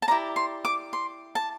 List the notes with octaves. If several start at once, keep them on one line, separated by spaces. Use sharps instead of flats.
A5
E4 G4 A#4 D5 A#5
C6
D6
C6
A5